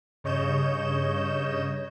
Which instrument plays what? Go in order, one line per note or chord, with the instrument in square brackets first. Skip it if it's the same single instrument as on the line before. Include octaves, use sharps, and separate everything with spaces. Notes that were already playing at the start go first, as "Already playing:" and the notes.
[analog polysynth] G2 C#3 C#5 D#5 G6 E7